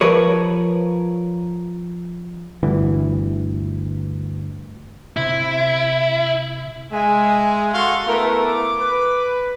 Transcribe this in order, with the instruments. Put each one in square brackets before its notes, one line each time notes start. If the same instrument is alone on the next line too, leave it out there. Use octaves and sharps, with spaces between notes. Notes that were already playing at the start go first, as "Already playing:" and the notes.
[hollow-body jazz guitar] F3 A#4 B4 C#5
[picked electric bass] G1 D2 E3
[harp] C3 C4 [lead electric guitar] E4
[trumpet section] G#3 [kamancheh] E5 G#5
[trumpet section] F#4 A4 F5 [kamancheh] C6 C#6
[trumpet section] A3 B3 E4 [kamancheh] A#4 B4
[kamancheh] D6
[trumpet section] B4